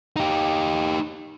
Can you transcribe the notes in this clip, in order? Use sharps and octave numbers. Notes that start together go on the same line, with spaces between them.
D#4 G4